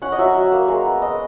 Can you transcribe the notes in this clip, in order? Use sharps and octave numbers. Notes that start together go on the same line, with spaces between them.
C#4 F#5
D#5
F#3 E5
F#3
A#3
G#3
B3
G#3 D#5